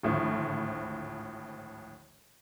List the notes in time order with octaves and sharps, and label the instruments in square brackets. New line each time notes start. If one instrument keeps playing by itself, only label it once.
[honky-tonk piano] G#1 D2 A2 F3